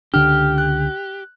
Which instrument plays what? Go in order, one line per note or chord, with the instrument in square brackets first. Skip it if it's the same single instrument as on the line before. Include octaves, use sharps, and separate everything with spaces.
[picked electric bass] C#2 D3 D4 [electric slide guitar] G4 [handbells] F6
[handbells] F#6